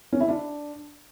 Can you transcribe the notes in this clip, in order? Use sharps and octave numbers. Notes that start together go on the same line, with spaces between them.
C#4
E4
D4